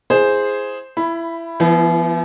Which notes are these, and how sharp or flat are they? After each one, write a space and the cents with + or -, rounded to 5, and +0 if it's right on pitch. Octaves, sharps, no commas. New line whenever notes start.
E4 +0 G#4 +0 C5 +0
E4 +20 B5 +0
F3 -40 B3 +0 E4 +20